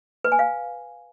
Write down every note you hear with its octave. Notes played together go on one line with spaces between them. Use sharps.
B4
G#5
F5